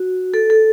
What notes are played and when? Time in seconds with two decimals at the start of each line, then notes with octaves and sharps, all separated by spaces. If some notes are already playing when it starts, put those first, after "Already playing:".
Already playing: F#4
0.34 A4
0.50 A4